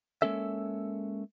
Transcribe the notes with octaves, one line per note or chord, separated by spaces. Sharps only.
G#3 A#3 C#4 A4 E5